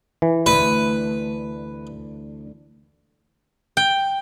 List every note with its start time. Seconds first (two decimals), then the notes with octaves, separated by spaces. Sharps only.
0.22 E3
0.46 D2 B4
3.77 G5